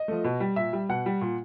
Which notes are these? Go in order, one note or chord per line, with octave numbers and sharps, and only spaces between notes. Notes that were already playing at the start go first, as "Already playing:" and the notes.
Already playing: D#5
F3 A3
B2
G3
A#2 E5
G3
B2 F#5
G3
A#2